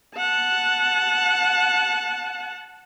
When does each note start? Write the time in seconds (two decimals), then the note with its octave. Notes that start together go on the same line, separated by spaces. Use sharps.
0.17 F#5 A5